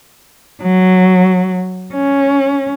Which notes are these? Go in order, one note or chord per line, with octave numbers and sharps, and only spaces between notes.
F#3
C#4